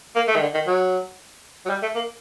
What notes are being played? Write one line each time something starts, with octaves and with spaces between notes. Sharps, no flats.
A#3
A3
D#3
D3
D#3
F#3
F#3
G3
A3
A#3